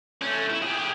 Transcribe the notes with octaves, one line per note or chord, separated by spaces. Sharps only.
A3 C#4
E4
G4 G#4